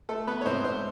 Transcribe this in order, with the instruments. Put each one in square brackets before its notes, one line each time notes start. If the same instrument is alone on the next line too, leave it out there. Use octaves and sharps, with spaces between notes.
[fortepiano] A3 A4
B3 B4
C#5
G#2 C4 C5
C4 C5